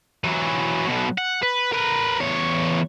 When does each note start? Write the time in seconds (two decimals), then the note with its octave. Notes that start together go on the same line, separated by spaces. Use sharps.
0.24 E3 F#3
0.88 B1 B2
1.18 F#5
1.43 B4
1.72 A#4 B4
2.20 E2 C#5